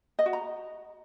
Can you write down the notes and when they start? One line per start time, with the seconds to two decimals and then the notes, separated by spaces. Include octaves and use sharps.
0.19 D#5
0.26 F#4
0.33 A#5